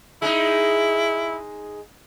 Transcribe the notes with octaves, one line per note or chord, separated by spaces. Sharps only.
G#3 D#4 E4